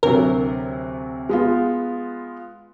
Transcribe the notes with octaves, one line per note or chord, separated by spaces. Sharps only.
D2 C3 F#3 A#4
G#3 B3 F4